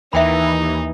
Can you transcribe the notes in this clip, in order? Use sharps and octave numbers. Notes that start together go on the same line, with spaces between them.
D#2 E3 D#4 E5 G5 B5